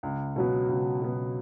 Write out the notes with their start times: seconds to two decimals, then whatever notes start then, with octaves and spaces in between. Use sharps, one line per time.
0.03 C#2
0.36 B2 F#3 B3
0.69 C#2
1.02 B2 F#3 B3